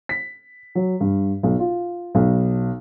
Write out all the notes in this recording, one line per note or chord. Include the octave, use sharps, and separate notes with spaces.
B6
F#3
G2
B1
F4
B1